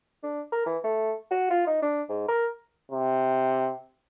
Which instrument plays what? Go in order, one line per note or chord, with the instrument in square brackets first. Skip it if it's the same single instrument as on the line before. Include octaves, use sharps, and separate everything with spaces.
[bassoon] D4
A#4
E3
A3
F#4
F4
D#4
D4
G#2
A#4
[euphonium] C3